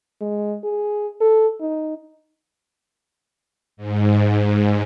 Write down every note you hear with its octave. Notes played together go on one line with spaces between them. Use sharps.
G#3
G#4
A4
D#4
G#2